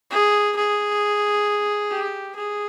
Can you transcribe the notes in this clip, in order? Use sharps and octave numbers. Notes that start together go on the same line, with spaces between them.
G#4
G#4
G4
G#4